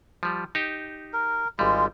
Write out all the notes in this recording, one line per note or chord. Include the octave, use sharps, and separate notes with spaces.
F3 G3
D#4 G4
A#4
G#1 G3 G#3 F4